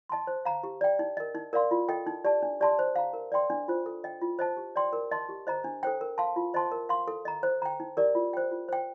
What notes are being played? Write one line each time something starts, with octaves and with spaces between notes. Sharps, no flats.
D#5 A5 C6
C5
F5 A#5
G4
D5 G5
D#4
A#4 D#5
D#4
A#4 D5 F5 C6
F4
A4 D#5 G5
D#4
G4 D5 A5
D4
G4 D5 A5 C6
C5
F5 A#5
A#4
D5 G5 C6
D4
F4 C5
A4
D#5 G5
F4
C5 D#5 A5
G4
D5 G5 C6
A#4
D#5 A5 C6
G4
C5 D#5 A#5
D4
A4 C5 G5
A#4
F5 A5 C6
F4
C5 D#5 A5 C6
A#4
F5 C6
A4
D#5 A#5
C5
G5 A#5
D#4
G4 A#4 D5
F4
C5 G5
F4
C5 G5